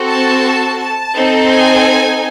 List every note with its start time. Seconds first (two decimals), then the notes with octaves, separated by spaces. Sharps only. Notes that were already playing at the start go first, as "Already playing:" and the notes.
Already playing: C4 F#4 A4
0.09 A5
0.81 A5
1.15 C4 D#4 A4
1.51 G#5